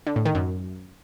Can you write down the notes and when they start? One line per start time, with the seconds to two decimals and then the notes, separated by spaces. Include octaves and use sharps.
0.07 D3
0.16 A2
0.25 D#3
0.35 F#2